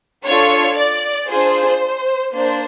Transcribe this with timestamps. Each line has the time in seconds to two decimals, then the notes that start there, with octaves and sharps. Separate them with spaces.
0.25 D4 F4 A4 C#5
0.77 D5
1.29 D4 F4 G#4 C5
2.33 A#3 D4 C5